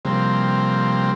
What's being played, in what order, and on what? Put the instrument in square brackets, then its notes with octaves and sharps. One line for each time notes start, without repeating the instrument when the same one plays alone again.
[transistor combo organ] C3 F3 G3 A#3 C4